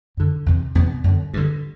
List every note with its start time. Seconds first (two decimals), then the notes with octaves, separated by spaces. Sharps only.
0.17 F#2 D3
0.46 E2 C3
0.75 E2 C3 B3
1.04 F#2 D3
1.34 G2 D3